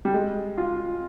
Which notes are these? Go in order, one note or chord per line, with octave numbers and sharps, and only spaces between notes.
G3
G#3
F4